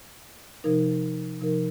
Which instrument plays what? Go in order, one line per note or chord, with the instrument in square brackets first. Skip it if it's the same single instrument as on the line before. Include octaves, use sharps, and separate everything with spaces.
[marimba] C3 F3 D#4 A#4
C3 F3 D#4 A#4